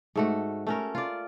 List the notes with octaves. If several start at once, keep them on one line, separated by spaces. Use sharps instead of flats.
G#2 A3 F#4
A3 C#4 A#4
F4 D5